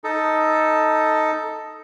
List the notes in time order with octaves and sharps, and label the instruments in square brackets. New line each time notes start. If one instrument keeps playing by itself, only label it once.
[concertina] D#4 A4